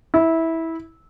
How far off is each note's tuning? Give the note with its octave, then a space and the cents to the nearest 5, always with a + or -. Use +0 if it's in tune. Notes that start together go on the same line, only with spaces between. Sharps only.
E4 -15